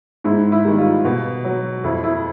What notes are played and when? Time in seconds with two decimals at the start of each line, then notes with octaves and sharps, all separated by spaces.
0.24 G#2 E4
0.52 E4
0.65 D#3 G3
0.78 F4
1.05 B2
1.44 F#3
1.84 F2 E4
2.04 E4